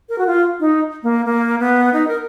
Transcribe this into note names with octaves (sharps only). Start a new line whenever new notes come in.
A#4
F#4
F4
D#4
A#3
A#3
B3
D#4
A#4